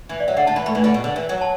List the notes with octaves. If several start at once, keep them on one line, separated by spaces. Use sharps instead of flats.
E3
D5
F#3 E5
D3 F#5
D3 A5
E3 B5
A3 B5
E3
D3 B5
B2
D3
E3
F#3
A5